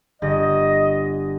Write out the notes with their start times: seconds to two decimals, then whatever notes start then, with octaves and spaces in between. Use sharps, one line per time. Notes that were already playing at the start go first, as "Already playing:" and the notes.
0.22 G1 D#5 A#6